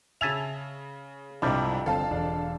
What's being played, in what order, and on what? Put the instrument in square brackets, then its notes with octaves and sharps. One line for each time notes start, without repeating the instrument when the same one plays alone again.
[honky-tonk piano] C#3 F7 [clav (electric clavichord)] E5 G#5 A5
[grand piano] C2 E4 [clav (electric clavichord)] F2 G3 [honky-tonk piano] G#2 C3 D4
[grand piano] G1 C4 [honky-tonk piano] A4 F5 A5
[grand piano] E1 D4